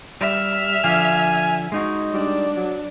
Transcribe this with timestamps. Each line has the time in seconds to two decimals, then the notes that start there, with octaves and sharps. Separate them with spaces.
0.21 G3 E5 F6
0.84 D3 F3 F5 G#5
1.72 G#3 D#4 F#4
2.12 G3 D4
2.57 F#3